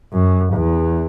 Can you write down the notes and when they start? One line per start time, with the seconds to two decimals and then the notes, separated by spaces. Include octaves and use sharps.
0.13 F#2
0.53 E2